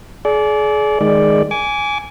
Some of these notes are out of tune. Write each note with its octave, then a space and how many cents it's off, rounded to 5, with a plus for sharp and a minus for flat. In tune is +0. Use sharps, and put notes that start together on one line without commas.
G#4 +35 D5 -20
D#3 +0 G#3 +10 D5 +0
G#5 +0 D6 -30